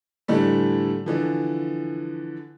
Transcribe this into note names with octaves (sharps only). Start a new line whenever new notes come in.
A2 D3 E3 G3 A3
D3 E3 F3